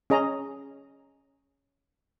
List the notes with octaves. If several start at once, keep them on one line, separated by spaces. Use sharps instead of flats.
C#4 G#4 D#5 A#5